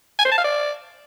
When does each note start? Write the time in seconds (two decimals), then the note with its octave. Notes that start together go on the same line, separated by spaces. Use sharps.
0.19 G#5
0.25 C5
0.32 A5
0.38 F5
0.44 D5